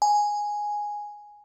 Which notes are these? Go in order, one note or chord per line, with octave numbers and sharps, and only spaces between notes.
G#5